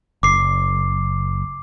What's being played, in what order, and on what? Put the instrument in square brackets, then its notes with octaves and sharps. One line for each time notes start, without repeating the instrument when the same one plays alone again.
[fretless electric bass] F#1 [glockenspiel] D6 C7